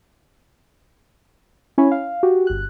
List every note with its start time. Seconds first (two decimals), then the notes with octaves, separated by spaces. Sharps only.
1.78 C#4 E4 C#5 G#5 B5
1.91 F5
2.23 F#4 G4
2.47 G1 F#6